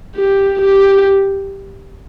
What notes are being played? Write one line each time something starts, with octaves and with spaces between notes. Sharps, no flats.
G4
G4